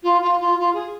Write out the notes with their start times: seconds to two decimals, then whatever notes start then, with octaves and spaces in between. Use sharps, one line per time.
0.03 F4
0.21 F4
0.40 F4
0.59 F4
0.74 G#4